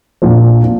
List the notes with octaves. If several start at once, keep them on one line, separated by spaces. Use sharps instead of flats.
A#1 A#2 F3
A#2